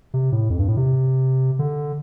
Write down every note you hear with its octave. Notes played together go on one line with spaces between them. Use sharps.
C3
A2
F2
G2
A2
C3
D3